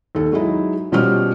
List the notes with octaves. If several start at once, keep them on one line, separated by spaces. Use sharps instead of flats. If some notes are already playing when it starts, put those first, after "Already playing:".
D#2 A4
F#3 G#3 D#4 E4
B2 F3 G3 C#4 F#4 F6